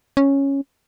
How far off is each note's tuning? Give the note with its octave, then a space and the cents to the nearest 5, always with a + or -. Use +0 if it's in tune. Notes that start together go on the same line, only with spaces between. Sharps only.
C#4 -5